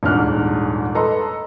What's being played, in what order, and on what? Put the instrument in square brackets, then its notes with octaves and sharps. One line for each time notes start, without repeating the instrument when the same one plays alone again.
[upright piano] D#1 E2 G#2 D4 F6 F#6
A4 B4 D#5 A#5 C6